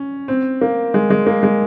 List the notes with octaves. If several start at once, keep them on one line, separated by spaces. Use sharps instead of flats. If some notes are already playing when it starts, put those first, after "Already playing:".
Already playing: C#4
C4
A#3
G#3
G#3
A#3
G#3